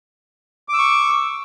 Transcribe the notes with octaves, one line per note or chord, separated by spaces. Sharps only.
C#6 D6 E6